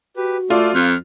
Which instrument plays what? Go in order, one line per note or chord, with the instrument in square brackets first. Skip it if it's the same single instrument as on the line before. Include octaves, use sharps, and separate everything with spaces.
[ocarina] F#4 [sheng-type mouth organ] G4 B4
[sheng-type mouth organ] A3 A4 D5 [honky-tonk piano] F4
[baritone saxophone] F2 [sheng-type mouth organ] F6